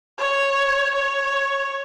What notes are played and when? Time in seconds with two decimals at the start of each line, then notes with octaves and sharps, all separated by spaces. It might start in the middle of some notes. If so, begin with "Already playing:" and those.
0.19 C#5
0.95 C#5